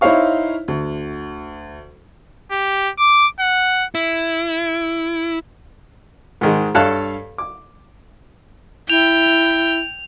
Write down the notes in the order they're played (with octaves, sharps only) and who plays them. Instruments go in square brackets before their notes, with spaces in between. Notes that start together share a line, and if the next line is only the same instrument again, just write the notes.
[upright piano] D#4 E4 C5 C#5 F5 C#6
D2
[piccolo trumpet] G4
D6
F#5
[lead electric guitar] E4
[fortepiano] G#2 D#3 G#3
G2 A4 C#5 F5 A5 F#6
D6
[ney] E4 [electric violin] G5 [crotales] F7